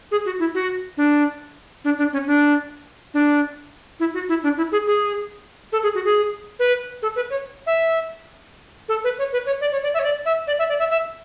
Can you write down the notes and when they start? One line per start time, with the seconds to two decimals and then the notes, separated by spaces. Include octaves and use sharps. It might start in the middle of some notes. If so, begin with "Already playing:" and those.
0.11 G#4
0.26 F#4
0.39 E4
0.55 F#4
0.97 D4
1.84 D4
1.98 D4
2.13 C#4
2.27 D4
3.14 D4
4.00 E4
4.14 F#4
4.29 E4
4.43 D4
4.57 E4
4.72 G#4
4.87 G#4
5.72 A4
5.83 G#4
5.95 F#4
6.05 G#4
6.59 B4
7.02 A4
7.16 B4
7.30 C#5
7.67 E5
8.89 A4
9.04 B4
9.19 C#5
9.33 B4
9.46 C#5
9.61 D5
9.72 C#5
9.83 D5
9.94 E5
9.99 C#5
10.04 D5
10.25 E5
10.47 D5
10.59 E5
10.69 D5
10.79 E5
10.90 E5